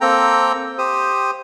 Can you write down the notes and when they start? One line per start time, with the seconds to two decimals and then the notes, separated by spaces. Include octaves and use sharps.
0.01 A#3 C4 A4 G5 A#5
0.78 G4 C5 D#6